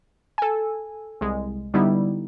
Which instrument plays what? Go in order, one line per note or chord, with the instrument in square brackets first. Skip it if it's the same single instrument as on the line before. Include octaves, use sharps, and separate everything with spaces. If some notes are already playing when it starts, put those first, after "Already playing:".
[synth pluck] A4 G#5
C2 G#3
D3 G3 B3 D#4 E4